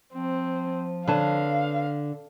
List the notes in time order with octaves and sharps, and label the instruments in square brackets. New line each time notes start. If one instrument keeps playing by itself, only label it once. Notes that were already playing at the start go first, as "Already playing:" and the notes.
[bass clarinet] F3 [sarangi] C4
[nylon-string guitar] D3 [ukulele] B4 C#5 A5 [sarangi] F5